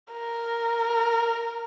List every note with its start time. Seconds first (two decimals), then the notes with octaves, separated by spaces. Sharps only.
0.13 A#4